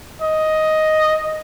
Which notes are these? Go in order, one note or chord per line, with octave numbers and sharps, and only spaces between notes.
D#5